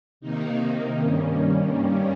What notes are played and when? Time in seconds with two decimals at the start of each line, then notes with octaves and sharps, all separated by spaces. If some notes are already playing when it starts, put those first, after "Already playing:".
0.20 C3 D#3 A#3 D#4
0.99 G2 D#3 G3 A#3 C#4